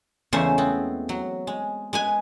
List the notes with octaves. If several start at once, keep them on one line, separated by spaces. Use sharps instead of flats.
E2 C#3 G#3 A3 C5 C#5
B3 C4
F#3
G#3
G#3 B4 G#5